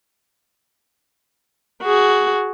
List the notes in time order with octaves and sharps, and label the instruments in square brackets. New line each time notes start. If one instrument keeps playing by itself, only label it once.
[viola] F#4 G#4